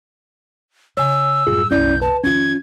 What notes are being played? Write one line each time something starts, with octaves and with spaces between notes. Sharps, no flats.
C#3 C#5 G#5 E6
F#2 A2 G3 F4 G#4
F#1 B1 C#4 E4 D5 G6
B4 A5
F2 D#3 C#4 F4 G#6